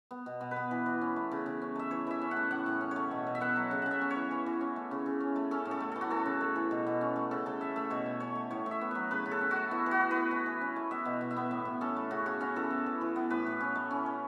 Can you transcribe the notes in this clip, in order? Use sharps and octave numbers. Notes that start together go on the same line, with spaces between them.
B3
B2
B2
B4
B3
E3
E3
C#4
A3
C#3
C#3
C#4
A3 E5
E3 C#5
E3 E5
C#4
F#5
A3
A2 F#5
A2
C#4
A3 C#5
B2
B2
E5
B3 F#5
F#3
C#3
C#3 F#5
E5
C#4
C#5
E3
E3
E3
C#4
A3
C#3
C#3
C#4
A3
C#4 A4
A2
A4
A3
E3 A4
F#4
C#4 A4
C#3
A3
E3
B2
B2
C#4
A3
C#3 A4
C#3 A4
C#4 E5
A3 E5
B2 C#5
B2
C#4 C#5
A3
A2 C#5
A2
E5
B3
F#3 B4
C#3 B4
C#3
A4
C#4
F#4
A3
B3 E4
E3
F#4
E3
B3 B4
E3
E3
C#4
A3
B3 E5
B2
B2
E5
B3
A2
A2
C#4 A4
A3
C#3 F#4
C#3 F#4
C#4 F#4
E3 A4
B3
E3
E3
B3
A2 B4
A2
C#4
A3
C#4
E3